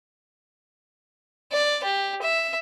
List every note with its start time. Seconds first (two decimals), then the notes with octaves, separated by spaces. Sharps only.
1.52 D5
1.84 G4
2.22 E5